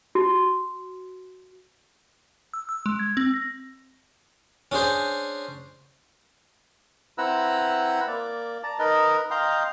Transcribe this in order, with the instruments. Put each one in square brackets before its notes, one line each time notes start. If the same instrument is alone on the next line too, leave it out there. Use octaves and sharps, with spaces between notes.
[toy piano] F#4
[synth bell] E6
E6
G#3
G#6
C4
A#6
[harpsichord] C#4 D4 G#4 C5
[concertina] C4 E4 B4 F#5 A#5 E6
A#3 D5
D5 A5 A#5
D#4 A#4 B4 D#5
D#5 F5 G5 A#5 C6